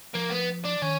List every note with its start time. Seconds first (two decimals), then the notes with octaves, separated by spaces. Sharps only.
0.15 F3 A#3
0.31 B3
0.65 D4
0.82 D#3 C#4